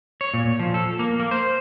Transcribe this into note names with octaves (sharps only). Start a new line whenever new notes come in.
C#5
A#2
F3
A4
A#3
A#3
C5